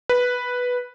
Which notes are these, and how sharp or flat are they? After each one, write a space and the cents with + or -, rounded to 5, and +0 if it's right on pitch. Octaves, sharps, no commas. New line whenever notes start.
B4 -5